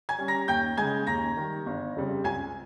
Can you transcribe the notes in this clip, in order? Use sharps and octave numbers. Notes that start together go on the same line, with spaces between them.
G#5 G#6
G3 C#4
A#5 A#6
D#2 G5 G6
C#3 G#3 G#5 G#6
D#2 A#5 A#6
D#3 G3
G1
F2 C#3 G3 C4
C#2 G#5 G#6